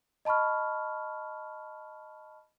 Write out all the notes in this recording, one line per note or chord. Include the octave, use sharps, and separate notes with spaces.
D#5 A5 B5 C#6 F6